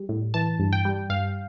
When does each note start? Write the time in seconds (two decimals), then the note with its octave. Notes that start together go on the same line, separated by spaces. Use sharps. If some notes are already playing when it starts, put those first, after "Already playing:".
Already playing: G3
0.09 A2
0.34 E3 A5
0.59 G2
0.73 G5
0.85 G3
1.10 G2 F5